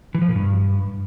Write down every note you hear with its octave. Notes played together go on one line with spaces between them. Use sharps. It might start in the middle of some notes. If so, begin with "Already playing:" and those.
E3
F3
A#2
G2